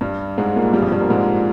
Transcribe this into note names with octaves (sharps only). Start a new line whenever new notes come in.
G2 G3
G#2 G#3
A#2 A#3
G2 G3
F2 F3
G2 G3
A#2 A#3
G#2 G#3